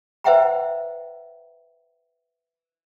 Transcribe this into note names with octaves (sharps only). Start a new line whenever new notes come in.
B4 C5 E5 F#5 G5 A#5